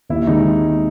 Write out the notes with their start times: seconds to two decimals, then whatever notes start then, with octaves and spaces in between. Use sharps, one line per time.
0.09 D#2 E4
0.27 D#3 G#3 C4 D#4